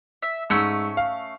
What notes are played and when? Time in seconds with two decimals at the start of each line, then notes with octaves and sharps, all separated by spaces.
0.22 E5
0.50 G#2 A3 C#4 E6
0.97 F5